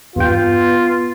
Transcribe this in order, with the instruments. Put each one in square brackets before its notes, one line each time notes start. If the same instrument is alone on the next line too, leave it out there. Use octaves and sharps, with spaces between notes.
[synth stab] E2 G2 G5 [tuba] B3 [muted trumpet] F4